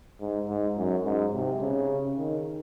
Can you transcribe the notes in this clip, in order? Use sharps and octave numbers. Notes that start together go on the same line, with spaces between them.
G#2
G#2
F#2
G#2
C3
C#3
D#3